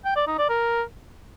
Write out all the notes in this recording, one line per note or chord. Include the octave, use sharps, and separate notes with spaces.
G5
D5
D#4
D5
A#4